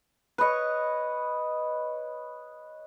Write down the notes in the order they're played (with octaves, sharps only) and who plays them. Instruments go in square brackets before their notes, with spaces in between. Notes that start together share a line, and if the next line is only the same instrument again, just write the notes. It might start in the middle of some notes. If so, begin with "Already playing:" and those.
[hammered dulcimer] B4 C#5 D#5 C#6